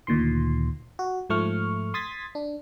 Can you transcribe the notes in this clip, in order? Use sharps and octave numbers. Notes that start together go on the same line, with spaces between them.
D2 A#2 D#3 C6
F#4
G#2 F3 A3 C#6 F6
C6 D#6 G#6 A6 B6
D4